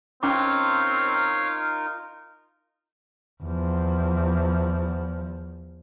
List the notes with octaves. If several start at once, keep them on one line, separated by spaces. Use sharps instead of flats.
C4 C#4 D#4 F4 A#4 C#5 F5 D6
E2 F3